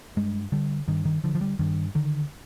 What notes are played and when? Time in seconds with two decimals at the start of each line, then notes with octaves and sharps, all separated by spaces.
0.17 G2 G#3
0.52 D3 G3
0.88 G2 D#3
1.05 D#3
1.24 D3 F3
1.35 F3
1.41 G3
1.59 G2 D#3
1.95 D3 D#3